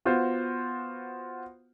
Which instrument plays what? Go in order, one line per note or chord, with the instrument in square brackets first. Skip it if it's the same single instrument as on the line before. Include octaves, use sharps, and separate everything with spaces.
[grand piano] B3 F4 F#4 C5